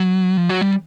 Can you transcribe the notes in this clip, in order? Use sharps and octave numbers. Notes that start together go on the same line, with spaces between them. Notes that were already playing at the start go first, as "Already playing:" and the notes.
Already playing: F#3
F3
F#3
G3